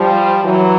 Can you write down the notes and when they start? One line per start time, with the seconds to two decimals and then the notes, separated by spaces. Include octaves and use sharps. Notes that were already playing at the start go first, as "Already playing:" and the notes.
Already playing: F3 G3
0.44 E3 F#3